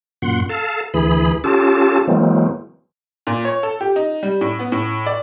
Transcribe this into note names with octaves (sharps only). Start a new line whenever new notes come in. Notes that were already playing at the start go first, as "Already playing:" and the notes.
F#2 A#2 F#5 C6
A4 F5 A5
D2 E3 G#4 B5
C#4 F4 G4 A4 A5
E3 F#3 G#3 A#3 C4
A#2
C#5
A4
G4
D#4
G3
A2
B3
A2
D5